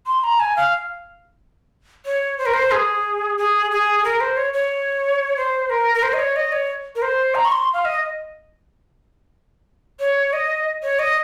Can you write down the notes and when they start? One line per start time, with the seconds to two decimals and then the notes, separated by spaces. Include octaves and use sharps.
0.07 C6
0.24 A#5
0.40 G#5
0.56 F5
2.06 C#5
2.38 C5
2.46 A#4
2.54 C5
2.71 G#4
3.38 G#4
3.71 G#4
4.04 A#4
4.21 C5
4.37 C#5
4.53 C#5
5.37 C5
5.70 A#4
5.94 A#4
6.03 C5
6.13 D#5
6.19 C#5
6.36 D#5
6.52 C#5
6.96 A#4
7.02 C5
7.35 A#5
7.45 C#6
7.52 C6
7.74 F5
7.85 D#5
10.00 C#5
10.33 D#5
10.83 C#5
10.99 D#5